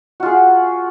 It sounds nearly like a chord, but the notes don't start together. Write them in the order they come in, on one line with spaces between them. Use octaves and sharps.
F#4 F4 G#4